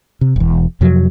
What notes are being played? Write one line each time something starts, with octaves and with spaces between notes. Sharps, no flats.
C3
E1 E2
F2 C3 F3 F#3